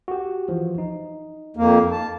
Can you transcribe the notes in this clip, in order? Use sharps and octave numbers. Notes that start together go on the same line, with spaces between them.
F#4 G4
E3 F3
D#4
F2 A#3
A5